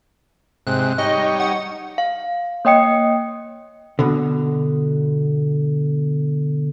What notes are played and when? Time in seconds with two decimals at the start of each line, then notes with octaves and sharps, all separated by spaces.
0.67 G#2 C3 F#6
0.98 G3 D#4 C#5 D#5
1.40 F#5
1.98 F5
2.65 A#3 C#5 D#5 G5 D#6 C#7
3.99 B2 D3